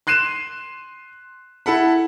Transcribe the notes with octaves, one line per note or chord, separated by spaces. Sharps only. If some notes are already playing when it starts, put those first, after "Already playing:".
C6 F#6 C7 D#7 E7
E4 A4 F#5 B5